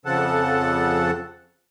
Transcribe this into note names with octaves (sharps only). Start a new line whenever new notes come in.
F2 C#3 F3 A4 F#5 A5